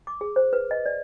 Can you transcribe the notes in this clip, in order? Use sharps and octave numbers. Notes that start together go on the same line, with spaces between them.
D6
G#4
C5
B4
D#5
D5